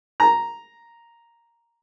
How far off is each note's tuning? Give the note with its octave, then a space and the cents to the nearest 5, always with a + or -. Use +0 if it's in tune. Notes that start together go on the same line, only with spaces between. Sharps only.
A#5 +0